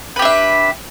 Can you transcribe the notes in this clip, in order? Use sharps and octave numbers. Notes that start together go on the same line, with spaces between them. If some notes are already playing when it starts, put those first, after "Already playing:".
D4 G4 B4 E5